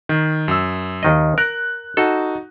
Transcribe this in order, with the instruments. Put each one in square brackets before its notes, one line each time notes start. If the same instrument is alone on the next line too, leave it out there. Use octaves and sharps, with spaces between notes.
[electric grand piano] D#3
F#2 E6
[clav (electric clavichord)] D#2 D#3 D#5
[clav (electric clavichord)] A#4 [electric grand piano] F#6
[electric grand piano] D#4 F#4 [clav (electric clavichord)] A4